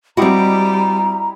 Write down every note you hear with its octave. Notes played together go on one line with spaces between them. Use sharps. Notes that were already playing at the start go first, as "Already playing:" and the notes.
G3 C4 E4 F#4 G4 D#5 A#5